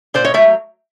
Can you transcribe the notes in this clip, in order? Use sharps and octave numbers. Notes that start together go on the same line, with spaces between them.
A#2 C5 D5
C#5 D#5
F#3 A3 D5 E5